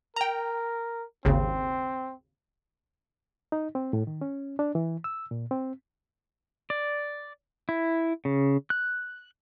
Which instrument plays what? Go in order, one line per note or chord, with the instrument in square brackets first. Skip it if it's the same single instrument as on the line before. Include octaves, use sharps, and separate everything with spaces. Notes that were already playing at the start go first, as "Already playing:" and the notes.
[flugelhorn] A#4 [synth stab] G5 A#5
[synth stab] G#1 D#2 C#3 [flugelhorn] C4
[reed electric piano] D#4
C4
A2
D#3
C#4
D4
E3
E6
A#2
C4
[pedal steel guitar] D5
E4
C#3
F#6